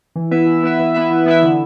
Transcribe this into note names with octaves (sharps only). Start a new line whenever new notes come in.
E3
B3 E4 B4 E5
E3
B3 E4 B4 E5
E3
B3 E4 B4 E5
E3
B3 E4 B4 E5
D3